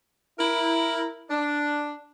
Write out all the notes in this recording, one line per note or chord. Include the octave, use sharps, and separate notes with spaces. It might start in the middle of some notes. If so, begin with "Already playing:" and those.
E4 A#4
D4